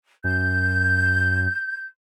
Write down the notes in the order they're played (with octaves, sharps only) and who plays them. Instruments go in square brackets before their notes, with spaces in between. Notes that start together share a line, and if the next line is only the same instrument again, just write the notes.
[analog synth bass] F#2 [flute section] G6